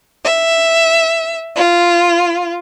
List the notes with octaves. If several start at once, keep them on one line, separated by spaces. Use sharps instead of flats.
E5
F4